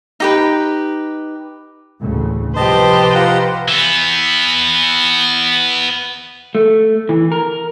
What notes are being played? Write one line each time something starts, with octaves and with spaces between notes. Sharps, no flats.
D#4 G4 B4
A1 D2 C#3
C2 F3 G4 B4 C5 D#5 A5
F4 F#5 A#5
E3 B3
A3
E3
A#4